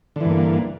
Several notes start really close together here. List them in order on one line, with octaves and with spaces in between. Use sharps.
D3 E3 G2 A#3